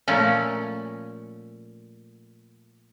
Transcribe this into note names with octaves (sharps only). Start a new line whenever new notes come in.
A#2 F3 A3 C#4